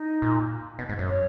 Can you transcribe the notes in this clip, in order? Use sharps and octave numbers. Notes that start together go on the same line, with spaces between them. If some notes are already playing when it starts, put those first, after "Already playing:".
Already playing: D#4
A#2
B2
G#2
F#2
C#5